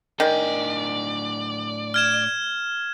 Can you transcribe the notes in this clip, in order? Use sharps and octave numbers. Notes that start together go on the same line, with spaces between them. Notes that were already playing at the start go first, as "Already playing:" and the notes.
A2 D#3 D4 D5 G#5
F6 G#6 E7